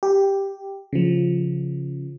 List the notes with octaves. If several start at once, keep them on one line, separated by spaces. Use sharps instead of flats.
G4
C#3 F3